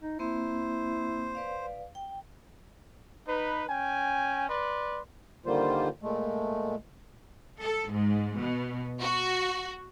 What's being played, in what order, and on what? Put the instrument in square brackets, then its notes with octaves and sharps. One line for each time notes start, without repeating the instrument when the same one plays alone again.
[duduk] D#4
[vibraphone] A#3 C4 [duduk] E4 [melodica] C5
[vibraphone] B4 D5 F5
G5
[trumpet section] D#4 B4
C#4 G5 G#5
B4 D5 C6
[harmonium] D3 D#3 G3 A#3 F4 C5
A#2 G#3 A3
[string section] A4
G#2
B2
F#4